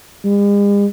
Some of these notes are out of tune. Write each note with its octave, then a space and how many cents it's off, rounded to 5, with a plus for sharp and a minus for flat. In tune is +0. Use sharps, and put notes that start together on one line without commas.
G#3 -45